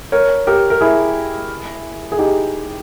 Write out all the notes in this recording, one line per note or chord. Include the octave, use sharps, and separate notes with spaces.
A#4 C#5
G4 A#4
A#4
E4 G#4
G#4
D#4 G4